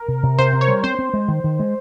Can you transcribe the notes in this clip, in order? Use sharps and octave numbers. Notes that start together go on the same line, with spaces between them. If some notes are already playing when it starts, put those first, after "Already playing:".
Already playing: A#4
C3
C3
C3 C5
C3
C#5
G3
C4 C5
C4
G#3
D#3
D#3
G#3